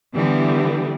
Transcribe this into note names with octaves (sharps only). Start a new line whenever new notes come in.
D3 E3 G3 B3